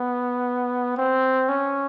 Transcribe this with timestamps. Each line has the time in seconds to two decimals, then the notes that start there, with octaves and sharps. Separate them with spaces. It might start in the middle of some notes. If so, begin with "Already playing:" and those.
Already playing: B3
0.97 C4
1.49 C#4